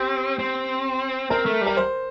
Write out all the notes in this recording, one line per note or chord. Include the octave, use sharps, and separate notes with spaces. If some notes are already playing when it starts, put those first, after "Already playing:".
Already playing: C4 G4
C4
C4 A#4
A3
G3
A#4
C5